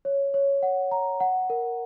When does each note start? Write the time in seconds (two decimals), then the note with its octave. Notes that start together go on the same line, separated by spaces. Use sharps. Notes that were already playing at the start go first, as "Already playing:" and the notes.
0.05 C#5
0.34 C#5
0.63 F#5
0.91 A#5
1.20 F#5
1.50 A#4